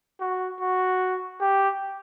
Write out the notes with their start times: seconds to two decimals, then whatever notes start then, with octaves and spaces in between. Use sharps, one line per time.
0.21 F#4
0.60 F#4
1.41 G4